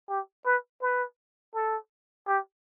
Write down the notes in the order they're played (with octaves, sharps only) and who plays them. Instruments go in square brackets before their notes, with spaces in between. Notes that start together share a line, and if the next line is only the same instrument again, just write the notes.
[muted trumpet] G4
B4
B4
A4
G4